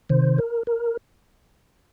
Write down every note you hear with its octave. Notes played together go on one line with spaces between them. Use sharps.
C3 D#3 C5
A#4
A#4